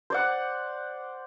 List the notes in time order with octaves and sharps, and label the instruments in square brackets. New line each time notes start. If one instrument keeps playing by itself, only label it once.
[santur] C5 D5 F#5